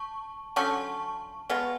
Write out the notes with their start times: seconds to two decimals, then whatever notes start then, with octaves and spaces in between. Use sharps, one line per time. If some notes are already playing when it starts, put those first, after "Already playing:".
Already playing: A5 C#6
0.56 D3 F#3 C#4 F4 A5 C#6
1.50 G#3 B3 F4